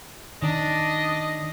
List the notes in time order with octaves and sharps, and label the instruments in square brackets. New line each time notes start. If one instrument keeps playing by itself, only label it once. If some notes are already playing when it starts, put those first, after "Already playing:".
[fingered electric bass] D#3 [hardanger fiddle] D4 [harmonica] D#5